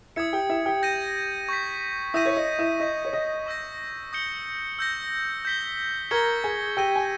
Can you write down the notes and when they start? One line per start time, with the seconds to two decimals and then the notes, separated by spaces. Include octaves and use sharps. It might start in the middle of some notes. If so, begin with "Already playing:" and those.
0.16 E4 E5 D#6 G#6 C#7
0.33 G4 G5
0.49 E4 E5
0.66 G4 G5
0.83 G6 A#6 D#7
1.49 C#6 G6 B6
2.14 E4 E5 D#6 G6 A#6 D#7
2.26 C#5
2.37 D#5
2.59 E4 E5
2.80 D#5 C#6 G6 B6 D#7
3.05 C#5
3.13 D#5
3.46 C#6 E6 G6 A#6
4.13 D#6 G6 C#7 G7
4.79 E6 G6 A#6
5.45 G6 B6 G7
6.11 A#4 A#5 C#6 G#6 C#7 G7
6.44 G#4 G#5
6.77 G4 G5 E6 A#6 D#7 G7
6.96 G#5